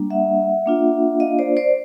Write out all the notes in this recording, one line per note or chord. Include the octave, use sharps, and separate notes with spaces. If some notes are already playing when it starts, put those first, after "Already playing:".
Already playing: G3 A#3 D4
E5 F#5
A#3 D4 F4
D#5 F5
C5 D5
C5 D5